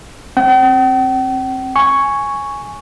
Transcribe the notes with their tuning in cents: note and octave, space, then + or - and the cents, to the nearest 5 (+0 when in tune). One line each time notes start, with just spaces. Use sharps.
C4 +25 G5 -45
G#5 +0 C#6 +0